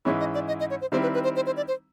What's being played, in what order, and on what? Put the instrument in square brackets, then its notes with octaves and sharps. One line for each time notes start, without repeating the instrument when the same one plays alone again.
[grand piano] G#2 E3 G#3 C#4 E4 [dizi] C#5
[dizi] D#5
D5
D#5
D#5
C#5
C5
[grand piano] D#3 G3 C4 E4 [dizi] C5
[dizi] B4
B4
C5
C5
C5
D5
C5